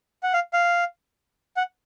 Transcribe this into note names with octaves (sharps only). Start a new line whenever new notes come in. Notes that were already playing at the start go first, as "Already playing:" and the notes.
F#5
F5
F5
F#5